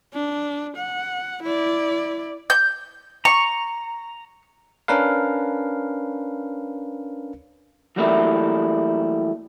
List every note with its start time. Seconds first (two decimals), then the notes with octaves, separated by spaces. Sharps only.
0.14 D4
0.76 F#5
1.43 E4 D5
2.50 G6
3.25 A#5 C#6
4.88 C#4 D4 A#4 B4 F5
7.96 E3 F#3 G3 A3 A#3 E4